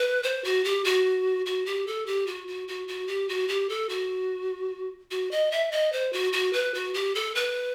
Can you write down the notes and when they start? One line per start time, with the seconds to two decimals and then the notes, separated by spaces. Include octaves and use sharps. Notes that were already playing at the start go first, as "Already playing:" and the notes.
Already playing: B4
0.23 C5
0.44 F#4
0.65 G4
0.84 F#4
1.46 F#4
1.66 G4
1.87 A4
2.06 G4
2.27 F#4
2.47 F#4
2.68 F#4
2.88 F#4
3.08 G4
3.29 F#4
3.48 G4
3.69 A4
3.89 F#4
5.11 F#4
5.31 D#5
5.52 E5
5.72 D#5
5.92 C5
6.13 F#4
6.33 F#4
6.53 B4
6.74 F#4
6.94 G4
7.15 A4
7.35 B4